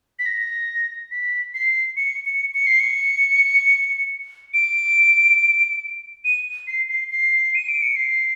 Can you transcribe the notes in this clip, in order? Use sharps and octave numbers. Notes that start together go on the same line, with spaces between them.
B6
A#6
B6
C7
C#7
C#7
C#7
C7
C#7
D7
D#7
C7
C7
C7
D#7
D7
C#7
C7